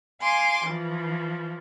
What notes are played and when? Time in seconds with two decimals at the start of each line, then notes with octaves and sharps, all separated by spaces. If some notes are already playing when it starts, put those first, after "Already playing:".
0.21 F5 G#5 C6 D6
0.64 E3 F3